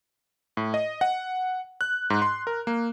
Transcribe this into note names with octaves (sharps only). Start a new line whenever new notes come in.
A2
D#5
F#5
F#6
G#2
C6
A#4
A#3